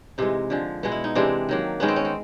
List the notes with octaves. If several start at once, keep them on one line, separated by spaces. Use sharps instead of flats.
C3 E3 G#3 D#4
D3 F3 G#3
B2 G#3 B3
E4
D#4
C3 E3 G#3 C4 D4
D#3 F#3 A#3
D#3 G#3 B3 C#4
C4
C#4
C4